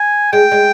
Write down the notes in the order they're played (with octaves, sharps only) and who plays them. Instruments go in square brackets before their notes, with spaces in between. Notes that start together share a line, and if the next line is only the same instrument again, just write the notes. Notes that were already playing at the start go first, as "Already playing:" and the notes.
Already playing: [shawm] G#5
[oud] G#3 [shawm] G5
[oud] G#3